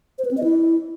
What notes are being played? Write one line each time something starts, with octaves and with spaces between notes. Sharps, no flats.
C5
B4
C4
D#5
E4